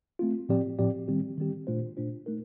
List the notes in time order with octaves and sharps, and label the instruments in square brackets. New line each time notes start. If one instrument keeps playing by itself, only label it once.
[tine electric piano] A3 C4 F4
A2 F3 C4 G4 D5
A2 F3 C4 G4 D5
D#3 G3 C4 G4
D#3 G3 C4 G4
A#2 A3 D4 F4 C5
A#2 A3 D4 F4 C5
A3 D#4 A#4